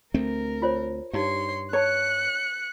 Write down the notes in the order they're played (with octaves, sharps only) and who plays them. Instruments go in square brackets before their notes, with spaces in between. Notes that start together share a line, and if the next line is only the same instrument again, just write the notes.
[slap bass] D2 A3 C4 [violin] A#4
[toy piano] F4 C5 C#5
[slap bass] G2 [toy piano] D#4 G4 F5 [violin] C#5 C6
[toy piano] B4 A5 [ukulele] C#5 [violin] F#6 C#7